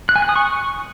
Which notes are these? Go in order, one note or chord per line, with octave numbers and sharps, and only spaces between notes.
F#6
G#5
F#6
D#6
C#6